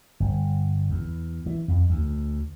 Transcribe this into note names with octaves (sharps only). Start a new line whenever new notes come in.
G1
E2
E3
F2
D2